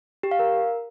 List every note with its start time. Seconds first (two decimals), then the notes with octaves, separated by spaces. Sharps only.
0.23 G4
0.31 F5
0.39 A#4